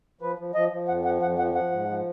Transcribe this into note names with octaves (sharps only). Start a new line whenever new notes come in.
F3 B4
F3
F3 D#5
F3
F2 F#5
F3 F#5
F2 F#5
F3 F#5
F3 F#5
G#2
F3